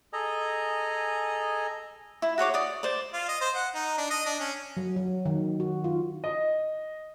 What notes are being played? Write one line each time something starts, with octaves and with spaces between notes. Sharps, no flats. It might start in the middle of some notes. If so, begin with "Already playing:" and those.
G#4 A4 D#5 G#5 A#5
E4
F#4 G#4 C#5 D6
D5 D#6
C5 D5
F4
D#5
C5
F#5
D#4
D4
D#5
D4
C#4
F#3
F#3
D#3
F#4
F4
D#5